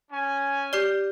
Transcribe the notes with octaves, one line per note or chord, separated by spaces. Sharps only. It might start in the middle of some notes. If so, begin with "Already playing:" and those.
C#4 G#5
G4 D5 F6 G6 C7 G7